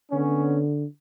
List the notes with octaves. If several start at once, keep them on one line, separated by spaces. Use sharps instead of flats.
D3 B3 C#4